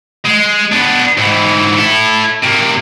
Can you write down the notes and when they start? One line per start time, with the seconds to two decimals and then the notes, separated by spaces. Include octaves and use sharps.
0.25 G#3
0.72 B3 D4
1.17 G#2 E3
1.78 E4 A4
2.44 C3 A#3